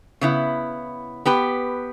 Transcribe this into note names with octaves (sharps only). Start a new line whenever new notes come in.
C#3 B3 E4
B3 G4 B4